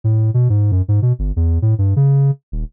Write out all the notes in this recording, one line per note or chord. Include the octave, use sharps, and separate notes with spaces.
A2
B2
G#2
F#2
G#2
B2
G1
E2
A2
G2
C#3
D#1